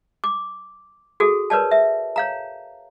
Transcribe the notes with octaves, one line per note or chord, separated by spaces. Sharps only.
D6
F#4 G#4 A4
A#4 B4 C#5 D5 A5
E5
C#5 F5 A#5